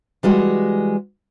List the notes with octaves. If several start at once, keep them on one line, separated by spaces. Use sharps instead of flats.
E3 G3 G#3 F#4